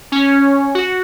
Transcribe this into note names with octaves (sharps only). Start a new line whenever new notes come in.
C#4
F#4